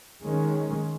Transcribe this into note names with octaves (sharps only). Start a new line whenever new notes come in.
D#3 G#3 C#4